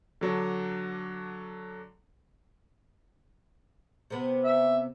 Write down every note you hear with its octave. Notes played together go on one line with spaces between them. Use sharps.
D3 F#3 D4
C3 B3
E5